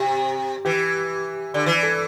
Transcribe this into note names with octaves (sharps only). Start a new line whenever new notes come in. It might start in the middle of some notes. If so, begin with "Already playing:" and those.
Already playing: C3 G4
E3 G4
D3
E3
A4